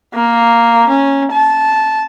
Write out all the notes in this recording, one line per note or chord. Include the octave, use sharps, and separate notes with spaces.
A#3
C#4
A5